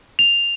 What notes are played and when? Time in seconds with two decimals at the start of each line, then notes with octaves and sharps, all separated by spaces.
0.19 F7